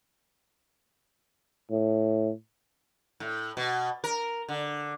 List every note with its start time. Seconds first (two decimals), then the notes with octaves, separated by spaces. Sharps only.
1.71 A2
3.20 A2
3.57 B2
4.04 A#4
4.49 D3